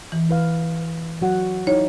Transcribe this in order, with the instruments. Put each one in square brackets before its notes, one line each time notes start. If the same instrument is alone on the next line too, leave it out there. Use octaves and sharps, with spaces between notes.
[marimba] E3
[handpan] E4 B4 F5
F#3 F#4 F#5
[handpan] D#4 E4 [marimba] C#5